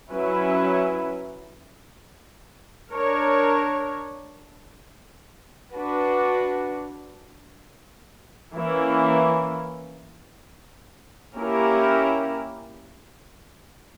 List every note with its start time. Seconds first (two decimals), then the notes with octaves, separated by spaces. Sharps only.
0.11 F#3 C#4 E4 B4
2.92 D4 A#4 C#5
5.73 D4 F#4 B4
8.55 E3 A#3 C#4 E4
11.36 A#3 C#4 E4 G4 A#4